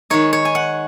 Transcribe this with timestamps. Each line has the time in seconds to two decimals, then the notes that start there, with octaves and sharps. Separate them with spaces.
0.10 D#3 G#3 D#4 C#5
0.33 C#5
0.45 G#5
0.55 F#5